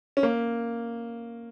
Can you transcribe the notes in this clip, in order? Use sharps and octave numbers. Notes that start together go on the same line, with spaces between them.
C#4
A#3